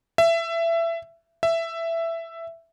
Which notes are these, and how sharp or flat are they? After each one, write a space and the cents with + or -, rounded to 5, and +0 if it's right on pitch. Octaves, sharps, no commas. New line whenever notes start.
E5 +20
E5 +10